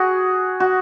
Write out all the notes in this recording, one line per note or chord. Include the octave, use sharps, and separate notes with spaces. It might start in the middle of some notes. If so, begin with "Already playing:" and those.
Already playing: F#4 G#4
F#4